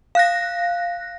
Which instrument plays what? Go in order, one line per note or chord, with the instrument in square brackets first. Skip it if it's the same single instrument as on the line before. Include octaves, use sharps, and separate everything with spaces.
[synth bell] F5 F#6 A#6